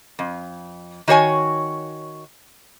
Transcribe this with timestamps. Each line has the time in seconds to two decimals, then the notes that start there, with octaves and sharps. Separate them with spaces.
0.19 F2
1.08 D#3 F#4 C#5 G#5